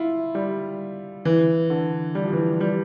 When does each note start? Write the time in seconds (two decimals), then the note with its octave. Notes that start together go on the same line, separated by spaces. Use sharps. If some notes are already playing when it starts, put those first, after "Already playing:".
Already playing: E4 F4
0.35 G3
1.25 E3
1.70 D3
2.15 G3
2.24 F3
2.33 E3
2.42 F3
2.61 G3